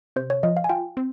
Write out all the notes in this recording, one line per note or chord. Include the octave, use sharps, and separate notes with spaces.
C3 C5
C#5
F3 D#5
F5
G#5
F4 G5
C4